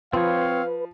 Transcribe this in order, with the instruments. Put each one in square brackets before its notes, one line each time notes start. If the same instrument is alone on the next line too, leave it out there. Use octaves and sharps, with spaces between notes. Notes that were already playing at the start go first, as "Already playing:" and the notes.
[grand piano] F3 [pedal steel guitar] C4 C#5 [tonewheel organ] B4 [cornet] F5